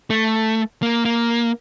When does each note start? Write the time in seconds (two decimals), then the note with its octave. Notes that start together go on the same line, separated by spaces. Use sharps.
0.10 A3
0.82 A#3
1.05 A#3